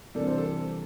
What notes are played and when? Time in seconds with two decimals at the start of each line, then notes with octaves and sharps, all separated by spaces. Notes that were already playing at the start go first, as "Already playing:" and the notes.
0.15 C3 E3 G3 D4 A4
0.26 C5
0.38 A4